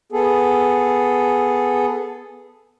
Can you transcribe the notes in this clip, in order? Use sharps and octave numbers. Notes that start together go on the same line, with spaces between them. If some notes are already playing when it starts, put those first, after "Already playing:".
B3 G#4 A4